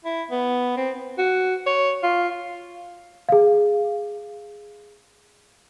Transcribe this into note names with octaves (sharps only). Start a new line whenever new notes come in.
E4
B3
C4
F#4
C#5
F4
G#4 F5